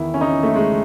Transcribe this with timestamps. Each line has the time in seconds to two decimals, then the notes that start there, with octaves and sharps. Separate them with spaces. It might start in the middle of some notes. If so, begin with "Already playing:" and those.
Already playing: E2 D#3 E4
0.14 C#4
0.21 D#4
0.29 C#4
0.43 A3
0.56 G#3